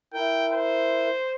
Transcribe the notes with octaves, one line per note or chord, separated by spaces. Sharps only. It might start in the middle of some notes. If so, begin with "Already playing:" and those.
E4 A#4 G5
C5